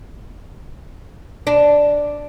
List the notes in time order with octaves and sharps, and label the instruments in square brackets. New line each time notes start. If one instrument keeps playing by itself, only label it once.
[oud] D4